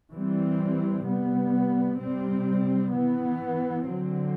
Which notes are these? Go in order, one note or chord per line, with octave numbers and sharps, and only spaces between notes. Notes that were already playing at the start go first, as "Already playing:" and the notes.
E3 G3 C4
C3 G3 B3
C3 G3 C4
E3 B3
D3 F#3 C4